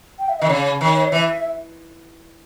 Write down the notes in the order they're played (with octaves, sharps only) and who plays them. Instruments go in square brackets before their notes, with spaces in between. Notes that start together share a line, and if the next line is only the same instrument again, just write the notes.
[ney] G5
E5
[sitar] D#3 [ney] D#5
[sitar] C#3 [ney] C#5
[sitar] D#3
[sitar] E3 [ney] E5